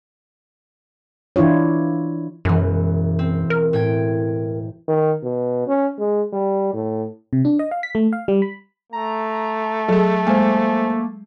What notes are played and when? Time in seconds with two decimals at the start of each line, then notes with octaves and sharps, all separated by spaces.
1.36 E3 D4 E4 F4 C#5
2.45 E1 F#2 E3
3.19 C4
3.50 A#4
3.73 A2 G5 G#6
4.88 D#3
5.23 B2
5.67 C#4
5.99 G#3
6.33 G3
6.74 A2
7.33 C3
7.45 D4
7.59 D#5
7.71 F5
7.83 B6
7.95 A3
8.13 F5
8.28 G3
8.42 B5
8.93 A3 A#5
9.89 F#3 G#4 A4
10.27 G#3 A#3 C5 G#5